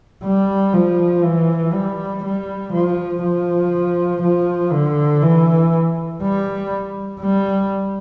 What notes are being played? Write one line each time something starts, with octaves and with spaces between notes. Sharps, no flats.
G3
F3
E3
G3
G3
F3
F3
F3
D3
E3
G3
G3